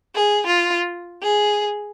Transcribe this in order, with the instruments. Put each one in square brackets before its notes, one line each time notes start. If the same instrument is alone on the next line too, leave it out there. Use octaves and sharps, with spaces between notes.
[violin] G#4
F4
G#4